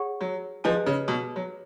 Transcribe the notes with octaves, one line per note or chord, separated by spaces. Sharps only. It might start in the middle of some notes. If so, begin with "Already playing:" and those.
Already playing: G#4 C#5 F#5 C#6
F#3
F3 G#4 B4 D#5 G#5
C#3
B2
F#3